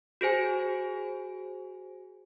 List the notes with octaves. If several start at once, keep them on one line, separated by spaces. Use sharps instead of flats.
F#4 G#4 C5 G#5